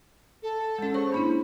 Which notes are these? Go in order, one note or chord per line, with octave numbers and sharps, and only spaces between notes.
A4
G#3 C#4
G#4 C5 C#5 C#6
A#3 D4 E4 B5